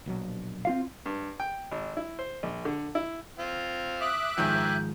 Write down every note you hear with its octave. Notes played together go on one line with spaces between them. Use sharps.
A#1 B2 F#3
C4 F4 F5
G2
G5
G#1
E4
C5
A#1
D3
E4
C4 F4
E5 D6 D#6 F#6
G#2 D#3 F3 G5 G#5 E6 G6